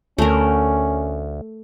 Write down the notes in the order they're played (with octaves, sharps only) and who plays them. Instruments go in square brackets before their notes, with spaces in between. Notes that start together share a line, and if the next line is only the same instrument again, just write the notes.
[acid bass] D2 [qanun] A3 A#4 [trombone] C#4